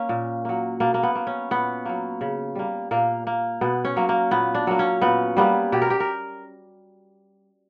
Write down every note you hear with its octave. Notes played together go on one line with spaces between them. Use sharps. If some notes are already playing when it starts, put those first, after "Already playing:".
Already playing: A#3 C#4
A#2
F#3 A#3
B2 A#3
A#3
B3
A#3
C#4
A#2 B3
F#3 A#3
C#3
G3 A#3
A#2 A#3
A#3
B2 B3
C#4
F#3 A#3
A#3
A#2 B3
D4
F#3 A#3
C#4
A#2 B3
G3 A#3 B3
B2 G4
A#4
G4
A#4